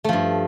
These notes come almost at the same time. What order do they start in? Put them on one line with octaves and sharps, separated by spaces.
A3 F3 G2